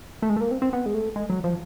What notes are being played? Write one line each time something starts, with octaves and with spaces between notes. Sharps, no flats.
A3
G#3
A3
A#3
C4
C4
B3
G#3
A3
G#3
F#3
F3